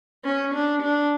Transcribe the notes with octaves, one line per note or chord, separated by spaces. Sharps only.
C#4
D4
D4